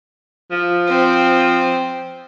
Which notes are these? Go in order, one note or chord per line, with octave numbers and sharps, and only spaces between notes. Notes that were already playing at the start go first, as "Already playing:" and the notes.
F3
C4